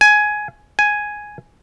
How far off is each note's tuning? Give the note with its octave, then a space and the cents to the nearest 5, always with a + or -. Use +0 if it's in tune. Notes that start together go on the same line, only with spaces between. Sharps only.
G#5 +15
G#5 +5